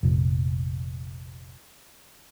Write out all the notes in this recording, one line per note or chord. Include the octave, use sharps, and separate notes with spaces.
F1 A#1